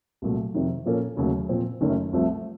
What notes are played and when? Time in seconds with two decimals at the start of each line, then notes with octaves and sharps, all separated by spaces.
0.22 C2 A#2 F#3 A3
0.55 F2 C3 D#3
0.86 A#2 F3 A#3 C#4 A4
1.17 D#2 C#3 F#3 A3 C#4
1.49 A#2 F3 C4
1.81 F#1 F#2 D#3 A3 C#4
2.13 C2 C3 F3 A3